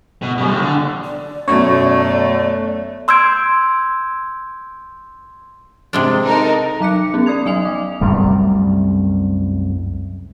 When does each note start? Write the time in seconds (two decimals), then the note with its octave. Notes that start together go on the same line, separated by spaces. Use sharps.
0.22 B2
0.38 F#2 G3
0.49 D#2
0.62 D3
1.04 D5
1.48 F#2 B2 A3 C#5
3.08 C6 E6 G6 G#6 D7
5.93 C3 G#3 D4
6.25 D#4 A4 A#4
6.81 F#3 D6 F#6 C#7
7.14 B3 C#4
7.26 D5 D#6 G#6 F7
7.46 F#3 D#5 G#5 D#6 F7
7.65 D6
8.01 C2 F#2 G3 A3